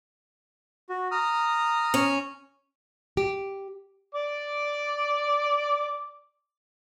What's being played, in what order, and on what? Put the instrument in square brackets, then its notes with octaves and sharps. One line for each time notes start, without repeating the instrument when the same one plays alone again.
[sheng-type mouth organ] F#4
A#5 D#6 F6
[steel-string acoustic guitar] C#4
[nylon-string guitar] G4
[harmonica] D5 D6